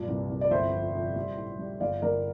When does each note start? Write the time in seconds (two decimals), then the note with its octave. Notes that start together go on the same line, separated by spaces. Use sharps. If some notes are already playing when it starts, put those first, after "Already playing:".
Already playing: G2 A#2
0.08 C2
0.29 C2
0.41 D5
0.51 G1 C5 E5
0.72 F2
0.94 F2
1.16 G3
1.37 A2
1.59 G3
1.80 G1 D5 F5
2.02 G1 A#4 D5